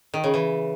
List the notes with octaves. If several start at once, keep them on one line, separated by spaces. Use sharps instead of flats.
D#3
C#3
E3